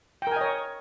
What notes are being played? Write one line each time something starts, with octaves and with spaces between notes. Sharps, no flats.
A#4 C#5 D#5 G5 G#5